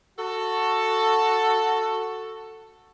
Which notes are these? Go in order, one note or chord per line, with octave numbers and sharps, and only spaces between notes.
F#4 A4